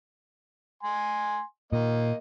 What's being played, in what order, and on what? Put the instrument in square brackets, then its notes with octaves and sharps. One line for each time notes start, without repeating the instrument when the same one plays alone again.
[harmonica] G#5 C6
[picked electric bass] A#2 [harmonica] A#3 D#5